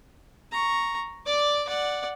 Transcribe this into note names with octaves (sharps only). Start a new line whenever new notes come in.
A#5 C#6
D5 D6
D5 F#5